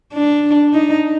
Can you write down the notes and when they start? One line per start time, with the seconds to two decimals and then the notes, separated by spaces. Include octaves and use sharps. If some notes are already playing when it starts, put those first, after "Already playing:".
0.14 D4
0.73 D#4